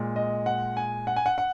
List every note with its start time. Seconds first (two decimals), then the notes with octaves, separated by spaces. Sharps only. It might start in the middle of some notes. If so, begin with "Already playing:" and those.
Already playing: A#2 G#3
0.16 D#5
0.46 F#5
0.77 G#5
1.07 F#5
1.16 G#5
1.26 F#5
1.38 F#5